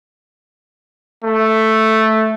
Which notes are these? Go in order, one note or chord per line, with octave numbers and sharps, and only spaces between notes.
A3